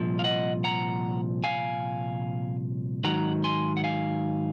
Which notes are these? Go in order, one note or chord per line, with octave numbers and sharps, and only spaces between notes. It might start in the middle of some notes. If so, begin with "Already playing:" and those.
Already playing: C2 A#2 F3
F5
D#5 F#5
F#5 A#5
F5 G#5
G#2 D#3 F#3 F#5 A#5
G#5 C6
F#5
F5 G#5